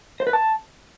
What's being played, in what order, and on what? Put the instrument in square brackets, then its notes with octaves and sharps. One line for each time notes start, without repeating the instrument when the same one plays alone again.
[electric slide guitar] C5
B4
A5